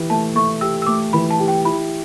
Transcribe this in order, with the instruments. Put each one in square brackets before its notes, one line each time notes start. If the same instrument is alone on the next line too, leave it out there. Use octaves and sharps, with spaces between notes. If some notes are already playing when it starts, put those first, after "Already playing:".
Already playing: [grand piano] E3 G4
[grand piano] A3 [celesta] A5
[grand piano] A3 [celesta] C#6
[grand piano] G4 [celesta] E6
[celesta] E6
[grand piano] A3 [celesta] D6
[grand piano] E3 [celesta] B5
[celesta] A5
[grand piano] G4
[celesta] G5
[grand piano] E4 [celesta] B5